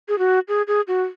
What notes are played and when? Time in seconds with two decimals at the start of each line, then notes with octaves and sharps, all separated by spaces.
0.09 G#4
0.19 F#4
0.48 G#4
0.67 G#4
0.88 F#4